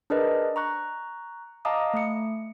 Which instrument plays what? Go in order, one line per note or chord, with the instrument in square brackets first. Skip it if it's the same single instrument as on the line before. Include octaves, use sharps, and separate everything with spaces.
[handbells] D4 G#4 A#4 B4 D5 D#5
A#5 C#6 F#6
D#5 F5 A5 A#5 D6 D#6
A3 C#7